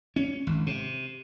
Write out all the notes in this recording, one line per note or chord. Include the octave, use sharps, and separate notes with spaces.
C#4
G#1
C3